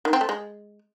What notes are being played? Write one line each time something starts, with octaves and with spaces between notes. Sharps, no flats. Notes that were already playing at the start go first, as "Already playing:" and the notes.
D#3
C4
A3
G#3